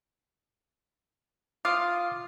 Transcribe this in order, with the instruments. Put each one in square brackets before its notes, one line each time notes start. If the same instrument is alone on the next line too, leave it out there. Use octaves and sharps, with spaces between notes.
[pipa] F4 [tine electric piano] D6 D#6 F6